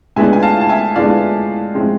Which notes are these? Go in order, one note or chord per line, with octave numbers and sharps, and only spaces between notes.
A2 G#3 B3 D4 F4 E5 G#5
G#5
F5 A5
A5
E5 G#5
A2 G#3 B3 D4 F4 D5 F5
A2 F3 G#3 C4